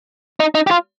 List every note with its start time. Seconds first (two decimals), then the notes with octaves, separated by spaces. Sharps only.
0.40 D#4
0.55 D#4
0.67 G4
0.71 F4